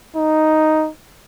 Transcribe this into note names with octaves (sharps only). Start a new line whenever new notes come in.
D#4